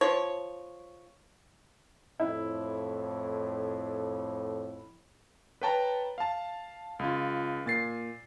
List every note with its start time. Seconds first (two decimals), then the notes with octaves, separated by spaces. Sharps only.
0.01 F3 C#5
2.20 F2 A2 E4
5.61 B4 C#5 G5 A5 A#5
6.18 F5 A5
6.99 C#2 F4
7.66 A#2 A6 C7